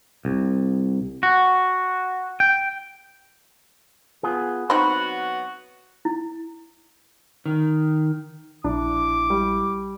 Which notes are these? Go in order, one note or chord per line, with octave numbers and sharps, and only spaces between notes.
C2
F#4
G5
B3 F4 G#4
F#3 B3 C4 D#4 F#4 B5
E4
D#3
A#1 D4 E4 D6
G3